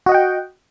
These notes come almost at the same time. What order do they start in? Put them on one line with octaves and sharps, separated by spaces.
F#4 D#5 F#5 G5